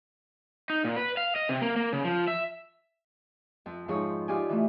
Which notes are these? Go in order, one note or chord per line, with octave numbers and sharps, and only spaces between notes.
D#4
A#2
B4
F5
D#5
C3
A#3
A#3
C#3
F3
E5
F2
F2 G#2 F3 D#4 G#4 C#5
D#4 F4 G4 D5 G#5
E3 A3